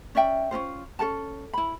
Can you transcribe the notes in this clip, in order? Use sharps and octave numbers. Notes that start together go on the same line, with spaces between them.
C#4 D5 E5 G5
C#4 D#4 F4 C5
C#4 A4 A#4 A5
E4 B5